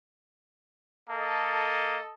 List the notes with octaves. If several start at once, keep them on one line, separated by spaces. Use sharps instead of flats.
A#3 A4 D#5